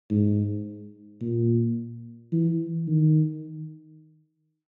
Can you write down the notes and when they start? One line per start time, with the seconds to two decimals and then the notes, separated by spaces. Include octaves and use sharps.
0.11 G#2
1.21 A#2
2.32 E3
2.88 D#3